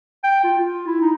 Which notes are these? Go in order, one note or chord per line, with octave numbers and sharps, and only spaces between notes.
G5
F4
F4
E4
D#4